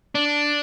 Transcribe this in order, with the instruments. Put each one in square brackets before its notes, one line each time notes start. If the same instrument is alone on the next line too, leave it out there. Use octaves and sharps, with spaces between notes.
[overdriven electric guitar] D4